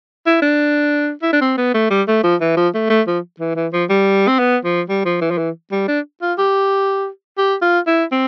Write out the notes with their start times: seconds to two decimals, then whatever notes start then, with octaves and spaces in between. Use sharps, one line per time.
0.26 E4
0.42 D4
1.22 E4
1.33 D4
1.41 C4
1.58 B3
1.74 A3
1.91 G3
2.08 A3
2.24 F3
2.41 E3
2.57 F3
2.75 A3
2.90 A3
3.07 F3
3.40 E3
3.56 E3
3.73 F3
3.90 G3
4.28 C4
4.39 B3
4.64 F3
4.89 G3
5.05 F3
5.22 E3
5.31 F3
5.38 E3
5.72 G3
5.88 D4
6.22 F4
6.38 G4
7.38 G4
7.62 F4
7.87 E4
8.12 C4